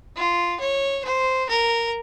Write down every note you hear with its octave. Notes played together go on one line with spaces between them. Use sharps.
F4
C#5
C5
A#4